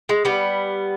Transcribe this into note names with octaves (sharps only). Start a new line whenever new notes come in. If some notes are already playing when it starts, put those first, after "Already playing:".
G#3
G3 B3